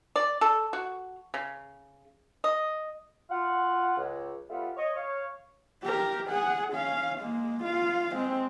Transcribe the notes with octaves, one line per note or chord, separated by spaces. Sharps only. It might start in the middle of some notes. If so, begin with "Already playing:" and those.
D5
A4
F#4
C#3
D#5
F4 F#5
C#2
G3 A3 B3 F4
C#5 D#5 C#6
C#5 F5
G4 A#4
G#4 F#5
C#4 F5
G#3 A#3
F4 F5
G#3 C4